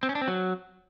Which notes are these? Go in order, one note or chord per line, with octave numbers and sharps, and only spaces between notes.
C4
C#4
D4
C4
F#3